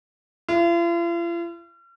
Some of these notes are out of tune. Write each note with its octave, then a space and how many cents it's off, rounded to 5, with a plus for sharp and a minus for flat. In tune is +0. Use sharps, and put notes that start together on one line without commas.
F4 -45